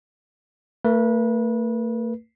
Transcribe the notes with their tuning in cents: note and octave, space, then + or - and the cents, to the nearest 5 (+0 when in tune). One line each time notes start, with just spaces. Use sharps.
A3 +40 B4 -30